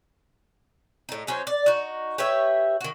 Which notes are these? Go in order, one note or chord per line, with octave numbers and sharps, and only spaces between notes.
A2 D#4
F#3 C#4 D#4 C5
D5
D#4 F#4
G4 B4 C#5 E5
D#3 F#4